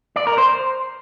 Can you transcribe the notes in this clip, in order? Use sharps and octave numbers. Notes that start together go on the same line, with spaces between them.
D5
A#4
C5